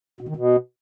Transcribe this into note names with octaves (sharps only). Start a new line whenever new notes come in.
B2
D#3
B2